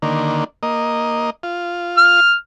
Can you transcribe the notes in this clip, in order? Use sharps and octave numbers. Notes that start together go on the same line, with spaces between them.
D3 D#3 A#3
A#3 D#5
F4
F6